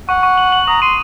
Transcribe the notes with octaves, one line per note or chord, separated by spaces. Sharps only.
F#5 C#6
C#6
F#7
F#7
A#5 D#6
C6 D#7